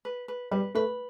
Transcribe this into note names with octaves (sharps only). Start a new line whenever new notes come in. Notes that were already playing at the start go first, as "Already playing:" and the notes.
B4
B4
G3 B4
A3 B4